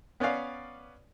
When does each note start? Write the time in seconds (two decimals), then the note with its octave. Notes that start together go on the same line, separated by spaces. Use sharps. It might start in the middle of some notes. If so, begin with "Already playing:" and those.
0.20 B3 C#4 B4 D5 F5